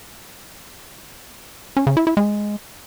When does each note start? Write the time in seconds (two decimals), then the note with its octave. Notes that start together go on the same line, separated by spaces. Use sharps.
1.77 C#4
1.87 C#3
1.97 E4
2.07 E4
2.17 G#3